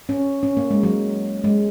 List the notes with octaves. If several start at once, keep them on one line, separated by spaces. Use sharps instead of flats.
C#4
C#4
A#3
G#3
F#3
G#3